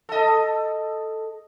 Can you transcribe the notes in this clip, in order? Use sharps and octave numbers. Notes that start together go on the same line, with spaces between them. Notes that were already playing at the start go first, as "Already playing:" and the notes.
A4 D#5